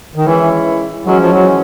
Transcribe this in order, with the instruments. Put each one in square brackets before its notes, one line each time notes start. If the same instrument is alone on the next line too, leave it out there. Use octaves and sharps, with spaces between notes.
[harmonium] D#3
[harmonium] E3 [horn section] G#3 C#4 E4
[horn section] E3 G#3 C#4 F#4 [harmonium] F#3
[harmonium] F3
F#3